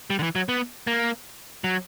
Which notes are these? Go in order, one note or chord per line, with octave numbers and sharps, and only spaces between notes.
G3
D3
E3
F#3
B3
A#3
F#3